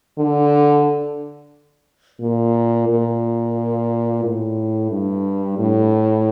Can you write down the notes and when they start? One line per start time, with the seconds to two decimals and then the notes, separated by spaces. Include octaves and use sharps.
0.18 D3
2.21 A#2
2.88 A#2
4.24 A2
4.91 G2
5.58 A2